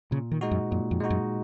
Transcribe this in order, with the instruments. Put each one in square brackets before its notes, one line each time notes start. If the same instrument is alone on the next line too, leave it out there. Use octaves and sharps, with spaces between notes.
[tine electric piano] A#2 [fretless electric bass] C#3
[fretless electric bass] D#3
[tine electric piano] G#3 D#4 F#4
[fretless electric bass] F#2
[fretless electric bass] F#2 [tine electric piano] A#2
[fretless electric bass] F2
[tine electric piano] G#3 D#4 F#4
[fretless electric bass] F#2